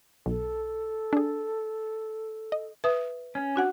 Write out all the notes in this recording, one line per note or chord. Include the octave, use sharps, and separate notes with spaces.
B1 A4
D4 G#4
D#5
B4 E5 D#6
C#4
D4 F#4 F#5